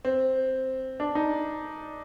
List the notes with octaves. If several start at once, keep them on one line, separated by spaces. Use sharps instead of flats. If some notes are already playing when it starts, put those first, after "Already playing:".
C4
D4
D#4